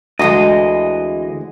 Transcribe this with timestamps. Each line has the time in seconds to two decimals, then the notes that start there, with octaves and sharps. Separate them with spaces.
0.19 D2 D3 E3 G#3 D#5